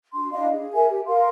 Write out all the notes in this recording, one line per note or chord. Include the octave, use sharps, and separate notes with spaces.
D4 F#4 C6
D4 E4 D#5 F5
G#4
A#4 E5 G#5
G4
A#4 F5 C6